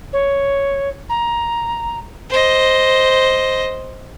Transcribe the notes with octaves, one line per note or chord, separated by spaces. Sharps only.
C#5
A#5
C5 D#5